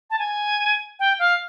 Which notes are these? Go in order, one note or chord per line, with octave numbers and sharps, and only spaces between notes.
A5
G#5
G5
F5